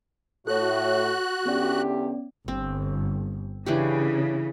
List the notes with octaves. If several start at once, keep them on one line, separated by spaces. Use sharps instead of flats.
A2 F#4 A4 C#5 F#6
E2 D3 B3 C#4 G4 D5
G1 C4
C#3 E3 D4 G4